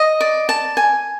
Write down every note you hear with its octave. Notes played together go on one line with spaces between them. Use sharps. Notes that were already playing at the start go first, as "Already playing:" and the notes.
Already playing: D#5
D5
A5
G#5